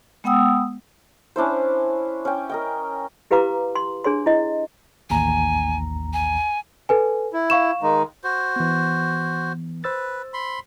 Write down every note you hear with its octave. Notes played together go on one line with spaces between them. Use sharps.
G#3 B3 F#5 G5 D#6 E6
C#4 D4 E4 C5
C#4 G5
A#4 D#5 G5
E4 G4 B4 F5 A#5 D6
C6
D4 G#4 C#5 C6
E4 D#5
A1 D#2 G#5 A#5
G#5
A4 B4 G#5
E4
F5 C#6 E7
D#3 G#3 D#4
F#4 C5
E3 B3
B4 C5 E6 A6
B5 C6